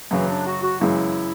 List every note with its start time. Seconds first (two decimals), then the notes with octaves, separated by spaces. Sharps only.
0.10 F#2 C#3 E3 F#3
0.28 D4
0.46 F#4
0.63 F#4
0.81 F#2 C#3 E3 G#3 E4